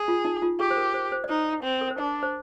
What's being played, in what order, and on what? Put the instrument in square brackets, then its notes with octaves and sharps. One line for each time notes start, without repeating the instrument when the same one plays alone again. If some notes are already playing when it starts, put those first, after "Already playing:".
Already playing: [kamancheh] G#4
[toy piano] F4
D#4
F4
[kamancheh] G4 [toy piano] G#4
[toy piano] C5
A#4
C5
C5
D5
[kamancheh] D#4 [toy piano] C5
[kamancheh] C4
[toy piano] A#4
C5
[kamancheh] D4 [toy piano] D5
[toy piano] C5